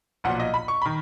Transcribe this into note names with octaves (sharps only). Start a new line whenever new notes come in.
B1 A#2 F3 F#5
D#5
B5
C#6
D#3 B5